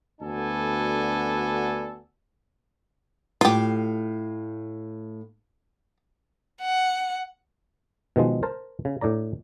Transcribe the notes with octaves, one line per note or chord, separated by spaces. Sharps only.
D2 B3 D4 F#4 A4 G#5
A2 F4 G4 F5
F#5
B2 D#3 F3 G#3
A#4 C5 A5
C#3
A2 D4 D5 A#5